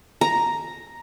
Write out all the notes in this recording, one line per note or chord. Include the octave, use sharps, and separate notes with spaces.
A#5